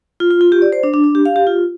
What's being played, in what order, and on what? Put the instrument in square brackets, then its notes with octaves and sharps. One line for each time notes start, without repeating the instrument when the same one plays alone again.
[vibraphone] F4
F4
F4
G4
D5
C5
D4
D4
D4
G4
F5
G4
F4